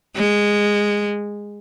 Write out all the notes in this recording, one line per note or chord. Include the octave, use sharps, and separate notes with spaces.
G#3